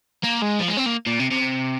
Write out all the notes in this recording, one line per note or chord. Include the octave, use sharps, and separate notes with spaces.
A#3
G#3
F3
G#3
C4
A#3
A#2
C3
C3